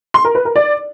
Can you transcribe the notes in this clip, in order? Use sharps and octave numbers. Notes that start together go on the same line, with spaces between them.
C6
A#4
B4
A#4
D5